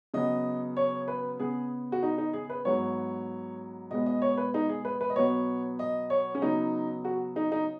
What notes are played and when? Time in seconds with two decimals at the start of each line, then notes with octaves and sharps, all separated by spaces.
0.14 C#3 F#3 B3 D#5
0.77 C#5
1.08 B4
1.39 C#3 B3 G#4
1.92 F#4
2.03 D#4
2.18 D#4
2.33 G#4
2.50 B4
2.65 G#2 F#3 B3 C#5
3.91 B2 G#3 B3 D#5
4.06 D#5
4.22 C#5
4.37 B4
4.54 D#4
4.69 G#4
4.85 B4
5.01 B4
5.10 D#5
5.16 B2 F#3 B3 C#5
5.79 D#5
6.10 C#5
6.35 C#4
6.42 C#3 F#3 B3 D#4
7.05 F#4
7.36 D#4
7.52 D#4